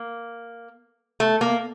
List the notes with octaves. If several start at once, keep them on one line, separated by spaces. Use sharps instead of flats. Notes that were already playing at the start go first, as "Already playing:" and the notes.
Already playing: A#3
A3
A#3